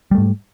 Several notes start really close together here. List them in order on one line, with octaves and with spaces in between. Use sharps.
G3 A3 G#2